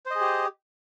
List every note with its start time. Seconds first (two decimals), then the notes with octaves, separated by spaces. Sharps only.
0.06 C5
0.11 D#5
0.16 G#4
0.21 G4